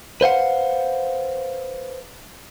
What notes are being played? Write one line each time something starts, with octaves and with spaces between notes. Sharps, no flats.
B4 C5 F5 F#5